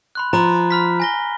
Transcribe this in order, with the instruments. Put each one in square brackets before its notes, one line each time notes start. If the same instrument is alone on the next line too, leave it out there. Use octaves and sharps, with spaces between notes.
[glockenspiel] B5 C6 F#6
[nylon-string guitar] F3 [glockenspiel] A#5 B5
[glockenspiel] B5 F6 B6
G#5 A#6 G7